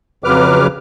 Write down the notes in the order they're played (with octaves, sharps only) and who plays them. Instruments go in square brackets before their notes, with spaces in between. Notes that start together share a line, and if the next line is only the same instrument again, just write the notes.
[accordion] F2 C#3 F#3 B4 D6 F6